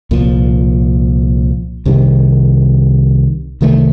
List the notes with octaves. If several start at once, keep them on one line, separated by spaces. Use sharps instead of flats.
C2 A#2 F3
C2 C3 D#3 G3
C2 C3 D#3 A3